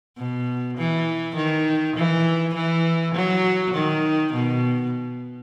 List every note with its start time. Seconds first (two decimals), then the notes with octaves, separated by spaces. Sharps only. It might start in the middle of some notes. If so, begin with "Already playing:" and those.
0.17 B2
0.78 E3
1.36 D#3
1.96 E3
2.55 E3
3.15 F#3
3.74 D#3
4.33 B2